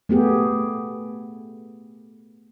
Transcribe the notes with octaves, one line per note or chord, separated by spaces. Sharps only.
A3 B3 G4 G#4